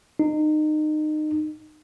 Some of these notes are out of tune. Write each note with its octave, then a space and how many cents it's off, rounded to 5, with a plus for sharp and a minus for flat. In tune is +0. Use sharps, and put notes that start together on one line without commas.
D#4 -25